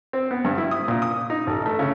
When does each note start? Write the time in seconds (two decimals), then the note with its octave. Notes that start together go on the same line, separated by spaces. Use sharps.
0.13 C4
0.31 B3
0.45 G2
0.58 E4
0.71 D#6
0.88 A#2
1.02 D#6
1.30 D#4
1.47 A1
1.66 A3
1.79 C#3